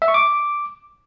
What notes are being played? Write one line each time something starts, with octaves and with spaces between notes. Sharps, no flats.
E5
C#6
D6